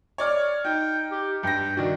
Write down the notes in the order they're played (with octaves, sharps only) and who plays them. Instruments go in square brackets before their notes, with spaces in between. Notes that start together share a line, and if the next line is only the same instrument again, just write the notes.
[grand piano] C#5 D5 F6
[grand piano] D#4 [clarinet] G5
[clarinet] G4
[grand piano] G2 A#6 [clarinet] G5
[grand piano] D#3 D4 [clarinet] F#4